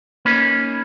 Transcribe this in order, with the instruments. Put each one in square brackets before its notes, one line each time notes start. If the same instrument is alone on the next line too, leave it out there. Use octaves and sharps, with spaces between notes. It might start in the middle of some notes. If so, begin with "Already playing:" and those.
[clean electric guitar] A#3 C#4 D#4 B4